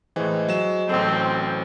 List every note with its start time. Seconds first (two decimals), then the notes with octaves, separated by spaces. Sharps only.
0.16 A2 E3 G#3 C5
0.49 F#3 E7
0.89 A1 F#3 C4 A4 D#5